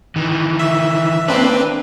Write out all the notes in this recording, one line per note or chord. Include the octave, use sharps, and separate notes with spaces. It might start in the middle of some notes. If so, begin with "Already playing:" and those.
D#3 E3
E5
A#3 C4 D4 B4